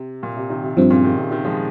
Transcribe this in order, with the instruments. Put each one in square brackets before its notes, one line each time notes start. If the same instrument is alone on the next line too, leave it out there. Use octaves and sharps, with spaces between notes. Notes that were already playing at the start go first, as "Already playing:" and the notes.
Already playing: [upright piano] C3
A#2
C3
C3 D#3
C3
[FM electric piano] G2 F3 C4 [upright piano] C3
[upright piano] A#2 C#3
C3 D#3
C3
C3 D#3
F3 G#3